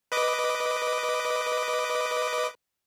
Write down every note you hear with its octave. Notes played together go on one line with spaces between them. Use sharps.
B4 D#5 D6